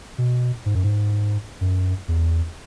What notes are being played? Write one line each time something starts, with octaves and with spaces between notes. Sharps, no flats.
B2
G#2
F#2
G#2
F#2
E2